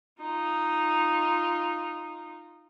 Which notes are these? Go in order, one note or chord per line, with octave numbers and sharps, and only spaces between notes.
D#4 F4